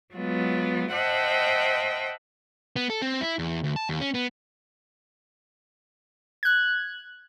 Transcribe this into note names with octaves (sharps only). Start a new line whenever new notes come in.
F#3 G#3 B3 F4
C5 D#5 E5 F#5 G5 A5
B3
A4
C4
E4
E2
D2
A5
D#2
C#4
B3
F#6 G#6